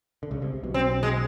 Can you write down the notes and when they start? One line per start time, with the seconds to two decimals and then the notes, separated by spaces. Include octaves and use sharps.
0.23 D3
0.31 C#2 C#3
0.42 C2 C3
0.63 B1 B2
0.74 C4
1.03 G#3